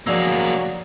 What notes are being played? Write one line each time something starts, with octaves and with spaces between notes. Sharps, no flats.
F3 F#3 A#3 G#4 D5